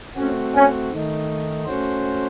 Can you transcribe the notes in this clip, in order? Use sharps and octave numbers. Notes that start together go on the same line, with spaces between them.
A3 C4 C#4 F#4
C#4
D#3 A3 D#4
A3 C#4 F#4 C5